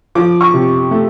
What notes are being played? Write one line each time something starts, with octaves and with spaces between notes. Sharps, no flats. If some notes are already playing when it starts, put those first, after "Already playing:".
F3 D6
C#6
C3
A3